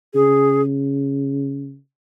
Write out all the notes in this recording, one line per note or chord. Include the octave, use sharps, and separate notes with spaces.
C#3 G#4